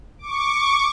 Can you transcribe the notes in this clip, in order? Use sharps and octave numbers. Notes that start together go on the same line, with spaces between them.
C#6 D6